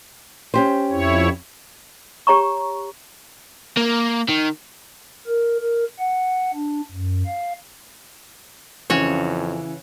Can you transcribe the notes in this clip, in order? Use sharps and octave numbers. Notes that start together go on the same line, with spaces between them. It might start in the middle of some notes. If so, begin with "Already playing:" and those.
C#4 G4 C5
F2 E4 C#5
G4 C#5 A#5 C#6
A#3
D#3
A#4
A#4
F#5
D4
F#2
F5
F2 C#3 E3 C#4 F#4 C#5